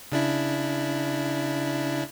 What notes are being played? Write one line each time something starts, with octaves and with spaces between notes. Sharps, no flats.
C#3 D4 E4